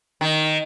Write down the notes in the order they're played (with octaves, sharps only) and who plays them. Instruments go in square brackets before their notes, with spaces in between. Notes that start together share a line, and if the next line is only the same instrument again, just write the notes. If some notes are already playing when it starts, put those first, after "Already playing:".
[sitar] D#3